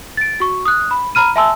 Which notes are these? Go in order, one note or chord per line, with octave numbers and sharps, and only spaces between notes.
A6 D7
F#4 C#6
D#6 F#6
B5
A#5 B5 F6 D#7
E5 G#5 A5 C6 E6